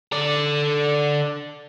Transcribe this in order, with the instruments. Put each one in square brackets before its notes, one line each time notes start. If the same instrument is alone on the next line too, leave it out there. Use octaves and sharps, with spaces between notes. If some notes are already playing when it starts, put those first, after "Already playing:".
[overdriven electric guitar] D3 D5